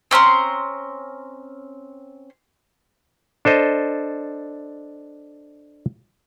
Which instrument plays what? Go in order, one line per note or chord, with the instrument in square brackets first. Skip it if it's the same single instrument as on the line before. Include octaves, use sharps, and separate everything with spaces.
[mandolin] C4 C#4 A#5 C6
[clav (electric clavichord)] D4 A4 C5 D#5